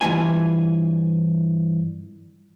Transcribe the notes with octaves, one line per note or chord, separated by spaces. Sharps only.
G2 E3 F#3 A#3 F4 G#5